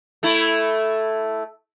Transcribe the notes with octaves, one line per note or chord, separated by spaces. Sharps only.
A3 E4